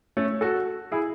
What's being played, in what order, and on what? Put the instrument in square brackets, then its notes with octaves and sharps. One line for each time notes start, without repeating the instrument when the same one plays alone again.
[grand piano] A3 C#4
F#4 A4
E4 G#4